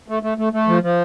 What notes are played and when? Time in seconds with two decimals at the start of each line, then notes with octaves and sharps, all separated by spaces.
0.08 A3
0.23 A3
0.38 A3
0.53 A3
0.68 F3
0.83 F3